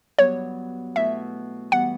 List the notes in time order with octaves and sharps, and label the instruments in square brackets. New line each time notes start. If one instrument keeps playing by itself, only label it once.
[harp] G2 F#3 B3 [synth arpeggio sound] C#5
[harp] B2 A3 E4 [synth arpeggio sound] E5
[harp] E3 G3 B3 [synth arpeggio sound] F#5